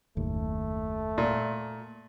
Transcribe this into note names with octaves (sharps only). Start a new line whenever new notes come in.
F#1 D#2 A2 A3
A#2